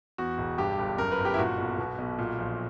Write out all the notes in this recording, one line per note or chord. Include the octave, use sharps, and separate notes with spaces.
E2 F#4
E1
G2 G4
G1
F#2 A#4
B4
G1
G4
E4
A#2 F#4
B1
B2
B1
A#2
A#1